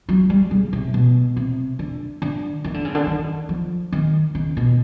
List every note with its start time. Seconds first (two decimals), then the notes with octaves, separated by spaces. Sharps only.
0.09 F#3
0.30 G3
0.51 C#3
0.73 C3
0.94 B2
1.36 C3
1.79 D3
2.22 D3
2.64 D#3
2.74 D3
2.85 C#3
2.95 D3
3.07 D#3
3.49 F3
3.92 D#3
4.35 C#3
4.57 B2